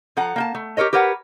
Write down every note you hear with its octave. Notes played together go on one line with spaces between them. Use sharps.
F3 A4 F#5 A#5
A#3 G5 A5
A3
G4 A4 A#4 C#5 D#5
G4 A#4 B4 C#5 F#5